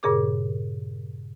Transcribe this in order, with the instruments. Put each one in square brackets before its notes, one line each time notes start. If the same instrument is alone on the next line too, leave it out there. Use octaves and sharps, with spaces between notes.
[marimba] G2 A#2 C#3 G#4 A#4 D6